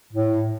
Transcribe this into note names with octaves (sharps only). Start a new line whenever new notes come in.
A2